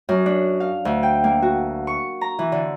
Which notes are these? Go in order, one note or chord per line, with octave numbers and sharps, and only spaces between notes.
F#2
D4
F5
D2
G5
A#3
F#4
C#6
A#5
E3
D3